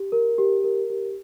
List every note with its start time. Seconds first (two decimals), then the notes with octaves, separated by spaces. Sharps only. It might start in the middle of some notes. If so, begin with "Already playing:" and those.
Already playing: G4
0.12 A#4
0.38 G4
0.64 A#4
0.90 G4